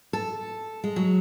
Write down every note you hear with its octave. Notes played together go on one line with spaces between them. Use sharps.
A4
G#3
F#3